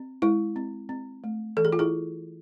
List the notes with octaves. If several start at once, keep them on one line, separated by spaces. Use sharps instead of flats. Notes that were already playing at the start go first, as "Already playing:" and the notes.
Already playing: C4
G#3 E4
C4
C4
A3
E3 A4
G#4
F4
E4 G#4